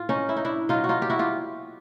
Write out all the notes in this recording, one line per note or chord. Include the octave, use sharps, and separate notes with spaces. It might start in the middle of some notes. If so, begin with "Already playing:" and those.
Already playing: A2 F4
C#4 D#4
E4
D#4
D4 E4
B2 F#3 D#4 F4
F#4
D#4 F4
G4
E4 F#4
F4 G4